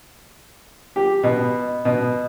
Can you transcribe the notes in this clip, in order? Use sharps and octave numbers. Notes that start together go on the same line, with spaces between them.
G4
B2
B2